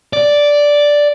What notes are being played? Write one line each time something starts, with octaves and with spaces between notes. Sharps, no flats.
D5